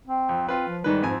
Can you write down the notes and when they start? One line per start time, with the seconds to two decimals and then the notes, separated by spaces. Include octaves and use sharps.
0.07 C4
0.29 F2
0.49 C4 F4 B4
0.68 F3
0.84 G#2 D#3 G3 B4
1.03 F2 G#2 C4 G#5